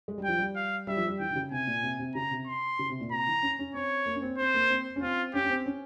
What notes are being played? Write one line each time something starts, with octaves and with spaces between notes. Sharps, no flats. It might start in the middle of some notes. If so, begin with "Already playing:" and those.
G#3
G3
F3 G5
G3
F5
G3 E5
F3
G3
E3 G5
E3
C#3
C3 G#5
A#2
C3
C3
C#3 A#5
C3
C6
C#3
C3
A#2
C3 A#5
E3
C#4
C#4
C4 C#5
A#3
C#4
C4
C4 C5
A#3
C4
C#4
C4 F4
C#4 G4
C#4
C4
C#4